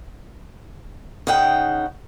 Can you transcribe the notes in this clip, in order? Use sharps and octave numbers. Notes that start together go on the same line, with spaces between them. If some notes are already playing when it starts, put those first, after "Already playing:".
C#3 D#4 F#5 G5